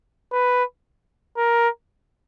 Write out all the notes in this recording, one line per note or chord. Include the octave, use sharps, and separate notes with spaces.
B4
A#4